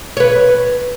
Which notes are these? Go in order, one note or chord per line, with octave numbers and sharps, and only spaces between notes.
B4 C#5